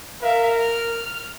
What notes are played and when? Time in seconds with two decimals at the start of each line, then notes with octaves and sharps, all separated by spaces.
0.23 A#4 E5 F5
0.61 F6